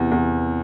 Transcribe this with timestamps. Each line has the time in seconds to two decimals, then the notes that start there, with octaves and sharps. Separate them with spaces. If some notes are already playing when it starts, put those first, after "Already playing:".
Already playing: E2 C3
0.11 E2